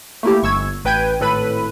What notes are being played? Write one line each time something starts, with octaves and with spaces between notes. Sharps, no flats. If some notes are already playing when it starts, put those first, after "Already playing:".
A3 A#3 E4 G4
G1 C#6 E6 G#6
A1 B4 G5 G6 G#6 D#7
G#1 A2 A4 B4 B5 D#7